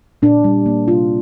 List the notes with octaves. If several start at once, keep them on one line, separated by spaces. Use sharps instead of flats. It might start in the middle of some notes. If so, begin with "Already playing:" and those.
A#2 D4
G3
A#3
C3 F4